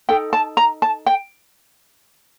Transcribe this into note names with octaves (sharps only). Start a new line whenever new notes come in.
D#4 A4 G5
A5
A#5
A5
G5